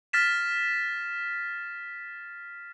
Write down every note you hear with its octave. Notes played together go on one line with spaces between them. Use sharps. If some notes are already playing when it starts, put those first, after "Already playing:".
F6 A6 B6 E7